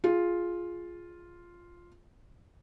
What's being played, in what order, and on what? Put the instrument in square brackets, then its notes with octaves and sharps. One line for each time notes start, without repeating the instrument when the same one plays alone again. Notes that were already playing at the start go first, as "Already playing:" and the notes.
[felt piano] F4 G#4